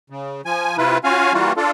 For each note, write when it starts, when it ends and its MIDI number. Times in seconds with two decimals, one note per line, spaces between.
0.10 0.41 49
0.46 0.77 53
0.46 0.77 80
0.78 0.98 48
0.78 0.98 64
0.78 0.98 65
0.78 0.98 71
1.04 1.33 61
1.04 1.33 65
1.04 1.33 66
1.04 1.33 77
1.04 1.33 80
1.33 1.53 52
1.33 1.53 55
1.33 1.53 58
1.33 1.53 65
1.33 1.53 66
1.57 1.71 62
1.57 1.71 65
1.57 1.71 69